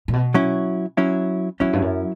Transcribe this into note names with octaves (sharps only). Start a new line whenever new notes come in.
A#2
B2
F#3 C#4 E4
F#3 C#4 E4
E2 F#3 C#4 E4
G2
F#2